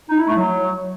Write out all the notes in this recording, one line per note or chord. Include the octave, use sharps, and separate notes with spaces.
D#4
E4
A3
F#3